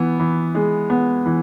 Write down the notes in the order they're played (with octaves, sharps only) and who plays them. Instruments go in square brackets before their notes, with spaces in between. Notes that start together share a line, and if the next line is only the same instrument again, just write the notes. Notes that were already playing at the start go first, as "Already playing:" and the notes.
Already playing: [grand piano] E3 B3
E3
G#3
B3
E3